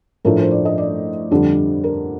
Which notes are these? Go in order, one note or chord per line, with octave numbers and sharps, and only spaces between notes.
A2 F3 A3 D4 A#4
C5
D5
D#5
D5
F2 D3 G3 D4
A#4